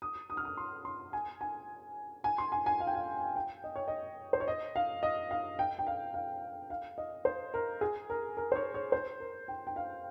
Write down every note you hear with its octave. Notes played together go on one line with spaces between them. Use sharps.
D#6
D#6
F6
D#6
C6
C6
G#5
G#5
G#5
C6
G#5
G#5
F5
G5
F5
G5
D#5
C#5
D#5
C5
C#5
D#5
F5
D#5
F5
G5
G5
F5
F5
F5
D#5
C5
A#4
G#4
A#4
A#4
C5
C#5
C#5
C5
A#4
G5
G5
F5